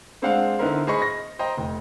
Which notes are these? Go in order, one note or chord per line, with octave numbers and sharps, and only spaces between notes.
G#3 C4 D4 C5 F5 F#5
D3 B3 D#4 E4 A#4 C5
G#4 C5 D#5 B5 C#6
A#6
C5 D#5 G5 A#5
F1